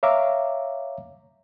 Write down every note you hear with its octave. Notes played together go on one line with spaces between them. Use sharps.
C#5 E5 F5 A#5 D6